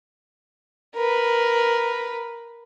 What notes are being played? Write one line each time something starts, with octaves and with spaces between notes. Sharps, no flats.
A#4 B4